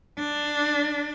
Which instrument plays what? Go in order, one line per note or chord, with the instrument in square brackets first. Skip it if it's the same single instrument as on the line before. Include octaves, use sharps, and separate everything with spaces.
[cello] D4